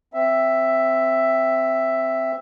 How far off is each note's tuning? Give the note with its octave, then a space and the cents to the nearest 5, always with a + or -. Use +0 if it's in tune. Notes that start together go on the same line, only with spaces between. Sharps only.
C4 -5 E5 +5